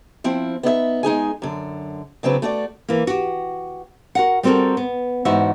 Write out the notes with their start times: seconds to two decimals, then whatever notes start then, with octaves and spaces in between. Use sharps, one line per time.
0.24 F3 C4 E4
0.63 B3 D#4 D5 E5
1.03 G#3 D#4 G#4 G#5
1.42 F#2 D3
2.23 C#3 F#3 C4 D4 B4
2.42 A3 E4 F#4 D5
2.88 E3 A#3
3.07 F#4 G4
4.15 F#4 A#4 F#5
4.43 G3 B3 C4 F#4 A4 A#4
4.77 B3
5.25 E2 G#2 B3 F#4 E5